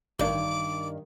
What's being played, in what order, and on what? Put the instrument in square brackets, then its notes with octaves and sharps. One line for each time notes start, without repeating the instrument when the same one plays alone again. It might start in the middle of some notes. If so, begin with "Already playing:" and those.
[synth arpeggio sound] A1 D4 [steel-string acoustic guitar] G2 [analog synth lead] D#3 [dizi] D6